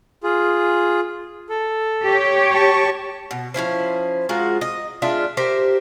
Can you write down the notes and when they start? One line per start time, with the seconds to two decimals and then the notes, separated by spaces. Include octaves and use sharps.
0.24 F4 G#4
1.49 A4
2.05 G4 C#5
2.53 A5 C#6
3.31 B2
3.54 F3 C#4 E4 C5
4.29 G#3 F4 F#4 A#4
4.61 D#5
5.02 G#3 D4 F4 E5
5.37 G4 A#4 C5 E5